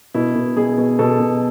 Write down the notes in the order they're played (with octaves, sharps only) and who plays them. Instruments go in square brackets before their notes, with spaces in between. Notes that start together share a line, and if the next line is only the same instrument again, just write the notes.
[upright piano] B2 E4
B2
B2 G#4
B2
B2 A4
B2